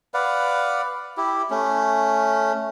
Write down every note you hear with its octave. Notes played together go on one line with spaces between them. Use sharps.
B4 D5 F5 F#5
E4 G4
A3 C#4